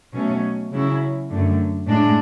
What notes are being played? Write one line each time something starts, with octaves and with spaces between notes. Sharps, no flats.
B2 F#3 A3 C#4
C#3 F#3 C#4 E4
F#2 D3 A3
A2 G#3 D4